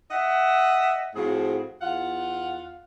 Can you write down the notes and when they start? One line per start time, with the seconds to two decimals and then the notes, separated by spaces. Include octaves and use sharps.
0.10 D#5 E5 F#5
1.15 A2 F3 C4 F#4 G#4
1.81 E2 F4 F5 F#5